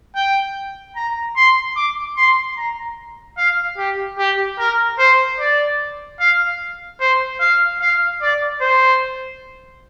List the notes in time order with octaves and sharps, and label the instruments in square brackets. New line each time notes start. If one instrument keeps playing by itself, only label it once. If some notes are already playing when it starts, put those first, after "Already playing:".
[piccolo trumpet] G5
A#5
C6
D6
C6
A#5
F5
G4
G4
A#4
C5
D5
F5
C5
F5
F5
D5
C5